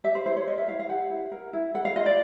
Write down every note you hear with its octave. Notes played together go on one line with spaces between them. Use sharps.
G4 E5
C5
E4 C5
C#5
A#4 D#5
E5
E4 F5
F5
G4 F#5
E4
A#4
E4
A4 F#5
F5
F4 D#5
D5